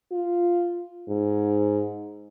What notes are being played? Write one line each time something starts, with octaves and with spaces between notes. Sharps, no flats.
F4
G#2